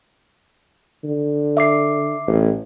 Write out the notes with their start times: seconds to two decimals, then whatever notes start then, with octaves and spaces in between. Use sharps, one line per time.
1.04 D3
1.57 E5 D6 C7
2.27 A1